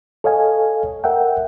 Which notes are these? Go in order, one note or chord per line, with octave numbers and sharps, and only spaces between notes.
A4 C#5 D#5 F5 G#5
A#4 E5 F#5 G5